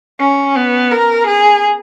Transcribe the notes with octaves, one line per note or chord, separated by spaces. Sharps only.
C#4
B3
A#4
G#4